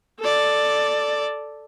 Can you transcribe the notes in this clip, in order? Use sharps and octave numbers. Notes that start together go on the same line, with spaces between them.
A4 D5